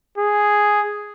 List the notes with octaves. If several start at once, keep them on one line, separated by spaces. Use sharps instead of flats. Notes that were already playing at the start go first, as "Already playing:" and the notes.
G#4